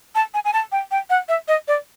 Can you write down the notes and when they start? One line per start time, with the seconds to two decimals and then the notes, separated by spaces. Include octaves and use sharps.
0.15 A5
0.34 G#5
0.45 G#5
0.53 A5
0.72 G5
0.91 G5
1.10 F#5
1.29 E5
1.48 D#5
1.68 D5